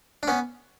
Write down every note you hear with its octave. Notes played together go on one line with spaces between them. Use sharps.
D4
B3 C#4